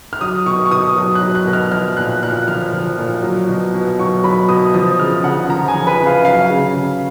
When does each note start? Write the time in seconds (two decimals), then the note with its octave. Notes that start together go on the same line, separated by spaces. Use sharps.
0.13 F6
0.21 F#3 D#6
0.46 B2 C#6
0.66 C#6
0.71 B2 D#6
0.97 F#3
1.15 F#6
1.21 F#3
1.35 F#6
1.47 B2
1.53 F6
1.72 F3 F6
1.97 A#2 F#6
2.22 A#2 F#6
2.48 F3 F6
2.73 F3
2.99 A#2
3.23 F#3
3.49 B2
3.74 B2
3.99 F#3 C#6
4.24 F#3 B5
4.49 B2 D#6
4.74 F3 D#6
5.00 C#3 F6
5.24 C#3 F#5
5.49 F3 A#5
5.68 G#5
5.74 F3
5.87 B4
6.01 C#3
6.07 F5
6.25 F#3 F5
6.50 C#3
6.76 C#3